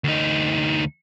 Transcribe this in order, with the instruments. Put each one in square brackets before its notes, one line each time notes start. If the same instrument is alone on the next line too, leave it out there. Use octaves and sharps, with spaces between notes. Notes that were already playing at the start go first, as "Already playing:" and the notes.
[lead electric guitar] D2 D#4